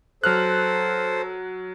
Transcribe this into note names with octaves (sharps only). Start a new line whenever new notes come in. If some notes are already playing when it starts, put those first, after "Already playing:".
F#3 A4 C5 F6 F#6